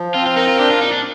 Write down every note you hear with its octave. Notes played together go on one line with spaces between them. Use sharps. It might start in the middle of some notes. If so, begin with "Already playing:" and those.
Already playing: F3
C4 F4
F4
D#4 A#4
F4
D4 G4
F4
A#2 D#4
D4